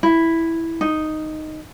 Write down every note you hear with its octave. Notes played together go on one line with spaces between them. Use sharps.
E4
D#4